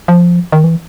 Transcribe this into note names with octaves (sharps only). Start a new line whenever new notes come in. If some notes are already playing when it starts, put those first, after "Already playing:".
F3
D#3
E3